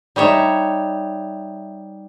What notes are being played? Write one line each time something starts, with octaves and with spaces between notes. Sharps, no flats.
G3 D#4 C#5 E5